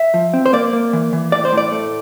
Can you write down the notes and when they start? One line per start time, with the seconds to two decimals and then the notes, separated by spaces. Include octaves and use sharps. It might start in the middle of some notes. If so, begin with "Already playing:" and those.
Already playing: E5
0.14 F3
0.34 C4
0.46 C5
0.53 A#3 D5
0.73 A#3
0.93 E3
1.13 E3
1.32 A2 D5
1.45 C5
1.52 A2
1.57 D5
1.72 A3